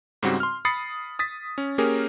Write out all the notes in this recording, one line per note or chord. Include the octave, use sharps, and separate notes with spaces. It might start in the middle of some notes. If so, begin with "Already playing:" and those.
G#2 C#3 G3 C4 F#4
C6 F6
B5 D#6 A6 C7 C#7
D#6 A6 B6
C#4
A#3 C#4 G4 G#4 A#4